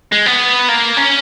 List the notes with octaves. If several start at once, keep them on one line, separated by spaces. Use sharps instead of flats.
G#3
B3
A#3
C#4